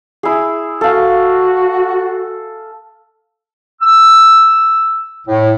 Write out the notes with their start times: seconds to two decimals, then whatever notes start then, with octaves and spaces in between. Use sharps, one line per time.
0.23 E4 G#4
0.81 F#4 A4 F5
3.82 E6
5.27 A2